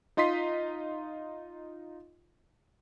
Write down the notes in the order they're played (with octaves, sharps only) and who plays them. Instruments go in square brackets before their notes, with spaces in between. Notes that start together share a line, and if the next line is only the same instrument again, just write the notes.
[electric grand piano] D#4 F4 D#5 C6 B6 C7